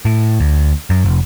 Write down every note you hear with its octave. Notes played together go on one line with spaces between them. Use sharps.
A2
D2
F#2
F1